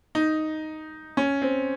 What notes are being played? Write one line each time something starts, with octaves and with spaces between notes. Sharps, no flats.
D#4
C#4
C4